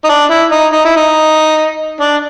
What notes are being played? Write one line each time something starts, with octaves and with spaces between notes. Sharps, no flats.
D#4
D4
E4
D#4
D#4
E4
D#4
D4